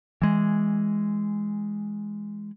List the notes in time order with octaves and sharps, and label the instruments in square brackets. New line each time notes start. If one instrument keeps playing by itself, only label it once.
[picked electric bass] E3 G#3